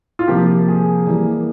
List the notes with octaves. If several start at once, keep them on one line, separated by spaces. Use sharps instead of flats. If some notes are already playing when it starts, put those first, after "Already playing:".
F4
C3 F3 A#3 G4
G#4
E3 G3 A#3